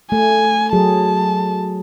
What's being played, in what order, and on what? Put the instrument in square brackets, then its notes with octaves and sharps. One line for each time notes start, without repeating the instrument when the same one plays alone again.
[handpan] A3 [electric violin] G#5
[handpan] F#3 G#4 [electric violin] A5